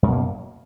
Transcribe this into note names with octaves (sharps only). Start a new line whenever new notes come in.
F#2 B2 A#3